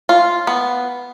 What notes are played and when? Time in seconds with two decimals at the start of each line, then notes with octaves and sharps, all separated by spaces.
0.09 F4
0.47 B3